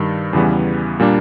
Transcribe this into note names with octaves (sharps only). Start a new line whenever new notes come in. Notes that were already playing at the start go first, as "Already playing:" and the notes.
Already playing: G2 D#3 G3
E2 C#3 E3 G3 B3
A#2 G3 A#3 D4